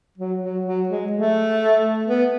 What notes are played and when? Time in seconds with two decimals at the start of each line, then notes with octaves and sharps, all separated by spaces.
0.18 F#3
0.42 F#3
0.65 F#3
0.89 G#3
1.12 A3
2.08 B3